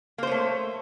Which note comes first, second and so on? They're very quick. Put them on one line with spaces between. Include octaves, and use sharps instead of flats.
A#3 C5 C#5 A3